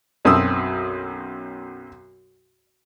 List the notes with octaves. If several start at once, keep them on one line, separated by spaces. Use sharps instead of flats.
B1 F#2 C4 D#6 E6